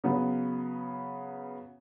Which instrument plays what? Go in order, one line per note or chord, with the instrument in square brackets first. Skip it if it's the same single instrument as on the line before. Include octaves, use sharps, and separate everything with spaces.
[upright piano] C#3 F#3 B3